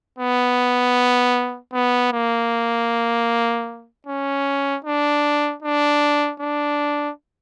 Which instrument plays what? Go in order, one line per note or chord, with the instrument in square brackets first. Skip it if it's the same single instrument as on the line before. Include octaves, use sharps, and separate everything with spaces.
[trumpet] B3
B3
A#3
C#4
D4
D4
D4